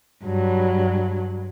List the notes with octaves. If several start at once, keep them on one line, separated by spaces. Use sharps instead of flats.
G2 F#3